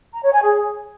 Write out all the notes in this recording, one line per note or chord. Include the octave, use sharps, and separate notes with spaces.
A#5
C#5
G#5
G#4